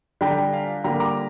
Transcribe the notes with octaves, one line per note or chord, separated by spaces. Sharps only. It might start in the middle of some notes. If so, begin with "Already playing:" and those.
D3 G3 D4 G4 G5 A#5
F5 G#5
D3 G3 A#3 G5 A#5
A#5 D6